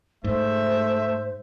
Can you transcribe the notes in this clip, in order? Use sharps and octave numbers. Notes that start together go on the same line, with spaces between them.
G#2 A3 C5 E5